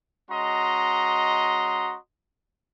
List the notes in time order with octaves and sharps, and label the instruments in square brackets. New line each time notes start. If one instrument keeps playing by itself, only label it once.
[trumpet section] G#3 C#4 F#4 D#5 A#5 C6